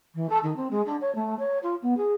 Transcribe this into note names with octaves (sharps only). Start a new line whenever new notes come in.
E3
A4
D#3
C4
G#3
D4
C#5
A3
C#5
F4
B3
G#4